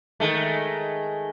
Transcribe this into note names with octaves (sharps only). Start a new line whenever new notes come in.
D#3 G#3 A3